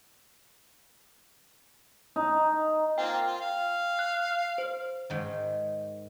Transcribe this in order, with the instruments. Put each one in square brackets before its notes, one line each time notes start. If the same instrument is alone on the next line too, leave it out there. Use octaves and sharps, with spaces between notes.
[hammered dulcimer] D#4
[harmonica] A#3 C4 F4 [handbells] G5
[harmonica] F4
F5
[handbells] F#6
C5
[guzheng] G#2 D#3